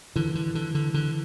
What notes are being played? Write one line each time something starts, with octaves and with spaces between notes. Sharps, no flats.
D3 E3
D3
D3
D3
D3